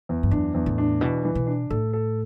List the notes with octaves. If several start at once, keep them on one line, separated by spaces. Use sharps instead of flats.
E2
G2
F#2 D4
E2
A2
D4
B2 E3
E3
B2
D4
A2 A4
A4